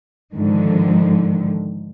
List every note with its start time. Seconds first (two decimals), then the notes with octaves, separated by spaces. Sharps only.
0.34 G#2 D3 D#3 F3